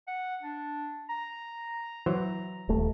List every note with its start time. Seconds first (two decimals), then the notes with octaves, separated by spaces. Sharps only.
0.08 F#5
0.42 D4
1.09 A#5
2.06 E3 F#3 C5
2.69 D#1 A3